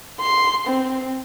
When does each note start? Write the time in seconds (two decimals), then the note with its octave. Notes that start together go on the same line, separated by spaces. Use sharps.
0.20 C6
0.67 C4